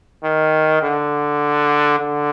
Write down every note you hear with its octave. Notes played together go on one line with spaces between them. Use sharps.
D#3
D3
D3